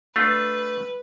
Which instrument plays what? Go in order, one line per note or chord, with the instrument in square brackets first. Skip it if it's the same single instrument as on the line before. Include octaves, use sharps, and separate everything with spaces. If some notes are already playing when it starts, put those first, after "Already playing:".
[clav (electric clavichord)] A3 D4 F4 [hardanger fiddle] B4